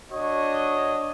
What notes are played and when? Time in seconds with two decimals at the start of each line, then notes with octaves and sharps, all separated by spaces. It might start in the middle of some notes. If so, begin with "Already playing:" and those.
0.12 D4 F#4 C#5 D#5